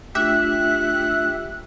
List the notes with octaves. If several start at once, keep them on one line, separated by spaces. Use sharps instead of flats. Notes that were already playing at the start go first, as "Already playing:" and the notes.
A3 D4 F4 G4 E5 F#6